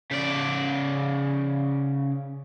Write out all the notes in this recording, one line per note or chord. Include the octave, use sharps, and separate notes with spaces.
C#3 D5